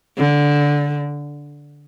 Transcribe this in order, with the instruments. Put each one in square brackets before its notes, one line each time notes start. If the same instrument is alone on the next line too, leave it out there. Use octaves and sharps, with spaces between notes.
[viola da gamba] D3